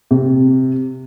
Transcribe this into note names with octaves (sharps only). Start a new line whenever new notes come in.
C3